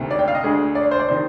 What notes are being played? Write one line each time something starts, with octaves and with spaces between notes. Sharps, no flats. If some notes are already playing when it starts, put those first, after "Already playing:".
Already playing: D2 C3 D#3
D5
G5
F5
D#5
D2 D3 G#4
D5
C5
D5
C3 D#3 C5